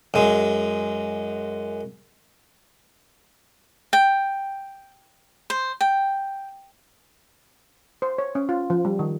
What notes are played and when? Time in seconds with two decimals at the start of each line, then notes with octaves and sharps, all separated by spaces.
0.14 F#2 G#3
3.93 G5
5.50 C5
5.81 G5
8.02 C5
8.18 C#5
8.35 C#4
8.49 F4
8.70 F3
8.85 G3
8.99 D#3